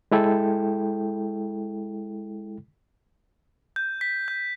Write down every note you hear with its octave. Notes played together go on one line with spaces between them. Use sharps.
G#3 E4 A4 G5
G6
B6
G6